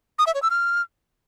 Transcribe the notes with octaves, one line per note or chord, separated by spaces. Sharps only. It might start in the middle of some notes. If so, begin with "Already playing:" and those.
D#6
E5
C#5
E6
F6